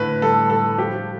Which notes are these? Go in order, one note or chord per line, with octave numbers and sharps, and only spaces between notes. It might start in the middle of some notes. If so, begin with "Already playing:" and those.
Already playing: A2 D3 B4
G3 A4
G3 A4
F3 G4